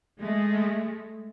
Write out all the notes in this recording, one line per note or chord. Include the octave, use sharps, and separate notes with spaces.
G#3 A3